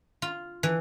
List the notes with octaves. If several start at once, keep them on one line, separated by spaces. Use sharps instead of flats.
F4
E3